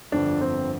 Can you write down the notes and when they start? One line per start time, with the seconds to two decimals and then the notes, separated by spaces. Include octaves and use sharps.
0.12 G1 F2 D3 F3 D4
0.41 C4